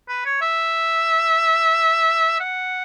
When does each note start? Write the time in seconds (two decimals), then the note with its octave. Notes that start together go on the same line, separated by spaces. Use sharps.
0.09 B4
0.25 C#5
0.41 E5
2.40 F#5